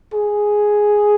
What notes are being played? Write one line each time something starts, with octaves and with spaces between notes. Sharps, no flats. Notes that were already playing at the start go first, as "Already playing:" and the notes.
G#4